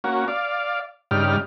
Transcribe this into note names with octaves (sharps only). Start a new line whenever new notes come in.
A#3 C#4 F#4
D5 F5
G2 C#3 G3 D#4 D5 F6